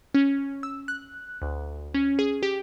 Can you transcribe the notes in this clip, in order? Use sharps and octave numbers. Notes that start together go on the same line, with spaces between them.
C#4
E6
F#6
D2
C#4
G#4
G4